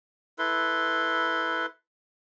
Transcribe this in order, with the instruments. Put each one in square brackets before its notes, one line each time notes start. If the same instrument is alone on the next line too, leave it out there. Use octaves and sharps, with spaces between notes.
[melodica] E4 A4 B4 C6